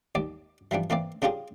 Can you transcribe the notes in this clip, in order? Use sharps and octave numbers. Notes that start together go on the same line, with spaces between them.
D#2 D5
E3 F3 G3 D4
E3 A#3 C4 D5
C#3 D4 F4 G4 G#4